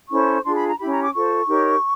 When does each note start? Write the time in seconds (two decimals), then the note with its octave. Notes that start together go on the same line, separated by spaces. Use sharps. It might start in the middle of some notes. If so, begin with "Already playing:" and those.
0.10 C#4 E4 A4 C5 C#6
0.45 D4 F4 G#4 C6
0.56 B5
0.68 A#5
0.78 C#4 E4 G4 B5
0.90 A#5
1.02 D6
1.13 F4 A4 C5 C#6
1.47 D#4 G4 A#4 C#5